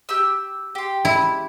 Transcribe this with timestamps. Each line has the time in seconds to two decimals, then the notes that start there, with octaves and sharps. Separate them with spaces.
0.09 G4 E6
0.75 G4 C6
1.05 E4